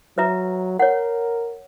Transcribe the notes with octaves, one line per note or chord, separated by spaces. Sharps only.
F#3 B4 E5 A#5
A#4 C#5 F#5